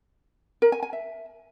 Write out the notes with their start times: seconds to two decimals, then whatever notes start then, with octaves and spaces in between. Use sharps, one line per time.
0.62 A#4
0.72 G#5
0.83 G#5
0.93 E5